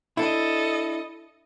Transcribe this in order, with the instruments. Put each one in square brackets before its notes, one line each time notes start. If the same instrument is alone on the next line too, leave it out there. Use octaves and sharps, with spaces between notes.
[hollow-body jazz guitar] D4 E4 [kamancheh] A4 D#5